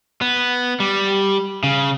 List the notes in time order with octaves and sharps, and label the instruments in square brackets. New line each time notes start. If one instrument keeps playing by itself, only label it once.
[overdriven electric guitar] B3
G3
C#3